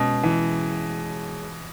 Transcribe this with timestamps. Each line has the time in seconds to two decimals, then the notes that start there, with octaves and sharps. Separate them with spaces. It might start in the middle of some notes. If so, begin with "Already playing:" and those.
Already playing: B2 G#3 C#4
0.23 E3